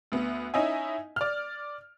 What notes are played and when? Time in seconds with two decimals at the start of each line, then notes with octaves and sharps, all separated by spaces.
0.12 D2 B3 B4
0.54 C#4 D#4 E4 D#5 E5 G#5
1.16 D5 F6